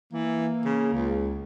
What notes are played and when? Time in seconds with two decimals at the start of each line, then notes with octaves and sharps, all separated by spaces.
0.13 E3 A#3
0.65 C#3
0.93 C#2